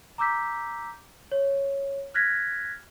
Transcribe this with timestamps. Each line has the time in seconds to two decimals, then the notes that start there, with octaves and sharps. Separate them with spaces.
0.18 A#5 D6 E6 G6 B6
1.32 C#5
2.14 F6 F#6 G#6 A#6 B6